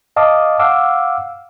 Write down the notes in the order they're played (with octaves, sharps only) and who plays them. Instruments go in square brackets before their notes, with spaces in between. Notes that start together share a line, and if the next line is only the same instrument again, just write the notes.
[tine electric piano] D#5 F5 A5 D6 D#6
F5 F#5 D6 E6